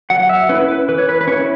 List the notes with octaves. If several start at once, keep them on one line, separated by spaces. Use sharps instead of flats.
F#3 F#5
E5
C#4 E4 B4
B4
E3 B4
C#5
B4
B4
C#4 E4 C#5